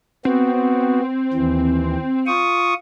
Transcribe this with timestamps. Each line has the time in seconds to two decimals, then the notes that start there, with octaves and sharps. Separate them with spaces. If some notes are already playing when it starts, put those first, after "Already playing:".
0.25 B3 C4 F#4
1.34 D#2 E3
2.27 F4 C#6 D#6